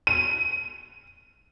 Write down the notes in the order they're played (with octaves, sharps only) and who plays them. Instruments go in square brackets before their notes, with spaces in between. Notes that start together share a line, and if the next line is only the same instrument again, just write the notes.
[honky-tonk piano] D#7